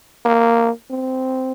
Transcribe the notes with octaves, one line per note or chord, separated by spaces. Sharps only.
A#3
C4